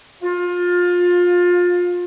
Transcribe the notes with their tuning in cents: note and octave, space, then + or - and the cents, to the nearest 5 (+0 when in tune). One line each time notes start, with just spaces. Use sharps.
F4 +25